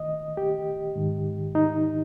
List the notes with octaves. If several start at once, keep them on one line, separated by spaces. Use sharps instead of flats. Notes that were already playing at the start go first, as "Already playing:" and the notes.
Already playing: D#3 D#5
G4
G#2 D#3
D#4